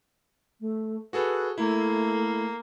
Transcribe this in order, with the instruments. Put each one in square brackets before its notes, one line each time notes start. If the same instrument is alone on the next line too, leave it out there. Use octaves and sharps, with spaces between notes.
[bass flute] A3
[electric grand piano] F#4 G#4 A4 [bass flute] B4
[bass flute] A3 [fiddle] A#3 [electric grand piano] E4